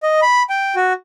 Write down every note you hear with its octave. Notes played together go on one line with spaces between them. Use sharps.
D#5
B5
G5
F#4